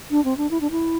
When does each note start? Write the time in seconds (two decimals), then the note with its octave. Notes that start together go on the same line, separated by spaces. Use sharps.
0.11 D4
0.25 C4
0.37 D4
0.51 E4
0.61 D4
0.71 E4